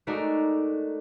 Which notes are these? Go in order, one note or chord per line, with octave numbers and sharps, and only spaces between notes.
G#3 A3 D#4 F#4 A#4 D5